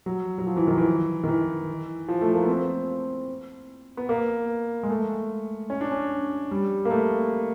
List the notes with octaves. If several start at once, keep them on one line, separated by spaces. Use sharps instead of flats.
F#3
F#3
F3
E3
D#3
E3
D#3
E3
F3
A3
A#3
B3
C4
B3
A#3
G#3
A3
C#4
D4
C#4
G3
A#3
A3